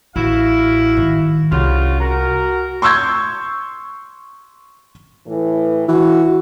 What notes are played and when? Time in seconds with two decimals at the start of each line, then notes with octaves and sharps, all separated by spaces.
0.16 A1 E4 F#4 F5
0.97 G#2 D#3
1.52 C2 C#3 F4 F#4
2.01 F#4 A#4
2.82 C6 C#6 E6 G6 G#6
5.27 A2 E3
5.89 E3 F#4